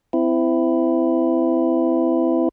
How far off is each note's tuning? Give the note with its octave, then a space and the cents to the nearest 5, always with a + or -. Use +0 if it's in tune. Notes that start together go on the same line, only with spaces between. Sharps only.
C4 -30 E4 +10